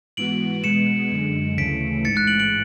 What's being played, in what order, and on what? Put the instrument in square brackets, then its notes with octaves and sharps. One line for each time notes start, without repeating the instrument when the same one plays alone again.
[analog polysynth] G#2 E3 B3 F#4 [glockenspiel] D7 F#7
[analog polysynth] B2 G#3 B3 [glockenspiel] C#7 E7
[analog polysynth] F#2 D3 G#3
[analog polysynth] D2 C#3 E3 A3 [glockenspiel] B6 D7
[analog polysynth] A1 G#2 E3 [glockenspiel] A6 C#7
[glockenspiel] F#6 A6
D7 F#7
D7 F#7